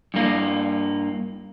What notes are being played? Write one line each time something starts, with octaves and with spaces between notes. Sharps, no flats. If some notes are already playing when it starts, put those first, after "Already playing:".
G2 A#3